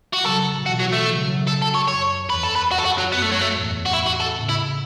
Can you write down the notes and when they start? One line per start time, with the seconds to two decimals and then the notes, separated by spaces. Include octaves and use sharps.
0.13 F#4
0.24 C#3 F#3 A4
0.65 B2 E3 F#4
0.80 F#3
0.92 A3
1.06 C#3 F#3
1.47 A4
1.62 A4
1.75 C#5
1.88 F#2 C#5
2.29 E2 B4
2.44 A4
2.56 B4
2.70 F#2 F#4
2.78 A4
2.85 F#4
2.98 F#3
3.11 F#2 B3
3.22 A3
3.31 F#3
3.41 A3
3.53 E2 A2
3.86 F#4
3.94 E4
4.07 F#4
4.21 A4
4.35 A2 C#3
4.49 E4